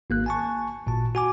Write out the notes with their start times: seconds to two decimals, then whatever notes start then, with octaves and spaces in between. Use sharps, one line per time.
0.10 G#1 A#3 F#6
0.26 G#5 A5 C#6
0.86 G#1 A#2 A5
1.15 F#4 G#5 D6